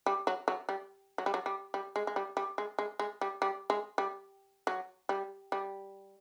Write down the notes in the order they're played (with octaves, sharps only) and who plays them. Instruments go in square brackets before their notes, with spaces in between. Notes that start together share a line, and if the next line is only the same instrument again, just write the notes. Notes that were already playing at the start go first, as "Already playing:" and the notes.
[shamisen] G3
F#3
F#3
G3
F#3
G3
F#3
G3
G3
G#3
G#3
G3
G3
G#3
G#3
G#3
G3
G3
G#3
G3
F#3
G3
G3